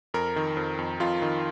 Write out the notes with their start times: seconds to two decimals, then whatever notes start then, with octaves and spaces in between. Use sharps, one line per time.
0.14 F2 A#4
0.36 D#3
0.57 F2
0.79 F2
1.00 F2 F4
1.22 D#3